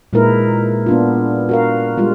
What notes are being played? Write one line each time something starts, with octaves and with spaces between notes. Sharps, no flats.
A#2 G#3 D#4 E4 A#4 B4
B3 D4 F4
F#4 A#4 F5
G3 G#3 F4